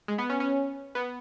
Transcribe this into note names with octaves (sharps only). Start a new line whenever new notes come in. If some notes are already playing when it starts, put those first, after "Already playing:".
G#3
B3
C#4
C#4
B3